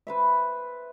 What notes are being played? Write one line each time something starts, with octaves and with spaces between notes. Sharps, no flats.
B4 C5 E5